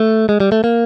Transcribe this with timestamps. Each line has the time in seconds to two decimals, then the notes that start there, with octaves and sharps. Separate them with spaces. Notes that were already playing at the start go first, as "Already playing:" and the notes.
Already playing: A3
0.29 G#3
0.40 G3
0.52 A3
0.64 A#3